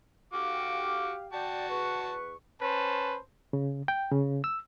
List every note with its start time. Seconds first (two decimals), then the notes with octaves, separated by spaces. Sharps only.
0.33 F#4 G4 F5 D6
1.33 F#4 D5 G5 A5
1.69 E2 B4 C#6
2.61 C#4 B4 C5 A5
3.53 C#3
3.88 G5
4.12 C#3
4.44 E6